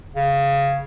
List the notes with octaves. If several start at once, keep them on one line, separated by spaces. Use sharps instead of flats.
C#3